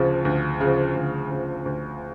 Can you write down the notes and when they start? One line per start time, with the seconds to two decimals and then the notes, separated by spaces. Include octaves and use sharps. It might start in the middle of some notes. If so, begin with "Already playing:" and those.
Already playing: D2 C#3 F3
0.25 D2
0.60 C#3 F3
0.95 D2
1.30 C#3 F3
1.65 D2